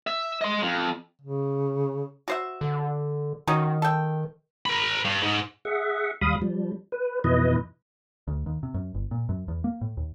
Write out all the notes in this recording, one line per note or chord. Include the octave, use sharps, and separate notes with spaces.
E5
D#5 C6
F2
C#3
F#4 C5 E5
D3
D#3 C#4 D#4 F#4
A4 G5
A#4 B5
G2
G#2
G#4 E5 F#5
D#2 G3 F5 B5 D#6
F3 G3
B4
F2 B2 E3 E4 B4 D#5
D2
D#2
C3
F#2
G1
A#2
F#2
E2
A#3
A2
D#2